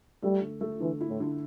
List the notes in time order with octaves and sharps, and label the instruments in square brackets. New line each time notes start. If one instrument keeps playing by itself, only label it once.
[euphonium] G3 [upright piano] A3
[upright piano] D3
A3
[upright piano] D3 [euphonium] E3
[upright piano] E4
[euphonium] A2
[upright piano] D3